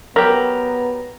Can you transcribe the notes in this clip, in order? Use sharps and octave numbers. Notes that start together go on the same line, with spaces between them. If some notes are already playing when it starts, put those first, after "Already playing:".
F#3 B3 G4 A#4 A#5